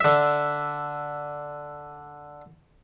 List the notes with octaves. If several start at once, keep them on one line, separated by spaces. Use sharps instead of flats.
D3 E5